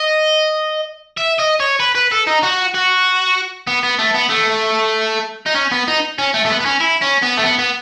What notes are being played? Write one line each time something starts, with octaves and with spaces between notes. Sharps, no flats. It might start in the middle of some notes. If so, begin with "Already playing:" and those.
Already playing: D#5
E5
D#5
C#5
B4
B4
A4
D#4
F#4
F#4
B3
B3
A3
B3
A3
D#4
C#4
B3
D#4
C#4
A3
A3
B3
B3
C#4
E4
C#4
B3
A3
B3
B3